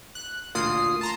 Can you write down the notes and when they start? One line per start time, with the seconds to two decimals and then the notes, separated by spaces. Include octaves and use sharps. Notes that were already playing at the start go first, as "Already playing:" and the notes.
0.15 F#6
0.55 A1 D2 A#2 F4 D#6 C7
1.01 A5 A#5 C6